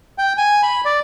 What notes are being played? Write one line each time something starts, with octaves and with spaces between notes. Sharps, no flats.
G5
G#5
B5
D5